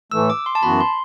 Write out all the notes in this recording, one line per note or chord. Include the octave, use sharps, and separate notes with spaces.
A2 E3 A3 E6
D6
C6
A5
F#2 E3 B3 F#4 B5
C6